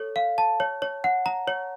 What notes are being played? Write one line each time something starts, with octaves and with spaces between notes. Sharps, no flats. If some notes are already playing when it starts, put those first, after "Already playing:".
Already playing: A4 C#5
F5
A5
C#5
C#5
F#5
A#5
C#5